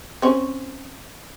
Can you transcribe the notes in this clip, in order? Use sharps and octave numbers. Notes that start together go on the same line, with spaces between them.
C4 C#4